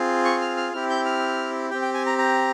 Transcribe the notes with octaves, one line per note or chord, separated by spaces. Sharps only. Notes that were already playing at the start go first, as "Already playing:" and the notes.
Already playing: C4 F4 G#4
C#6
F6
F6
C4 E4 G4 F6
G6
F6
C4 G4 G5
G5
G#5
A#5
A#5